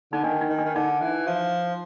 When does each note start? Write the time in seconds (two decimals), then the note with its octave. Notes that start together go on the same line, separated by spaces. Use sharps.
0.12 D3 D#4
0.24 D#3 D4
0.41 D#4
0.50 D#3
0.59 D4
0.65 D#3
0.75 D3 D#4
1.01 E3
1.27 F3